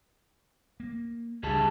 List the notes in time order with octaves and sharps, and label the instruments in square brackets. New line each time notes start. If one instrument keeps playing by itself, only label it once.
[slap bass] A#3
[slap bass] C#2 F#3 D4 [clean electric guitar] G3 G#4 A5